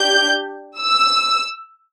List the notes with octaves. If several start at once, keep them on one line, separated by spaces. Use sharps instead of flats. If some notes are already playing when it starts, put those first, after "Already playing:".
Already playing: D4 G4 G6
E6